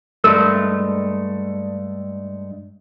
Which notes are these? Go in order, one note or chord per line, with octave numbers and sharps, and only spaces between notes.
G2 G#3 A3 A#4